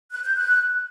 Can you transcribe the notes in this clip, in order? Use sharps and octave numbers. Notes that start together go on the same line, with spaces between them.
F#6
G6
F#6